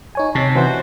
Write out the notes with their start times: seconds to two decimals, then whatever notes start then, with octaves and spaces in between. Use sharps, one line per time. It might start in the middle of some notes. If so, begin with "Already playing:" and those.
0.15 D#4 C#5 G#5
0.35 C3 A5
0.55 E3 F#4 C5